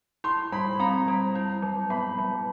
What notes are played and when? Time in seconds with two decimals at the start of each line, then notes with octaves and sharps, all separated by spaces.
0.24 E4 C6
0.52 G3 B5
0.80 C4 A#5
1.08 G3
1.35 E4
1.62 F#3
1.90 B3 B5
2.18 F#3